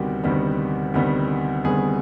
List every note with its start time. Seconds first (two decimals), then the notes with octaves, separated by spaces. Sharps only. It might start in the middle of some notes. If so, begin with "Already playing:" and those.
Already playing: D2 C3 D#3 G3 B3 F#4 G4
0.24 D2 C3 D#3 G3 B3
0.94 D2 C3 D#3 G3 B3
1.64 D2 C3 D#3 G3 B3 G#4